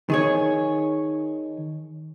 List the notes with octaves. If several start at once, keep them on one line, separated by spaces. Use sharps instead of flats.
D#3 G#4 C#5